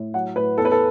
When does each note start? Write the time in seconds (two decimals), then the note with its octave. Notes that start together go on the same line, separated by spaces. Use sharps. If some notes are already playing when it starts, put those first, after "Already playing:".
Already playing: A2
0.14 F#3 F#5
0.36 A2 B4
0.58 E2 A4
0.65 B4
0.71 A4